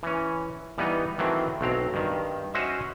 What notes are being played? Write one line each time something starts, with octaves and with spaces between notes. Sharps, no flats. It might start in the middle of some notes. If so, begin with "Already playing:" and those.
E3 C#4
E3 G3 B3 D#4
D#3 E3 F#3 A3 C4
B1 F#3 C4 A#5
G2 D#3
C#4 F#4 C5 D#5 E5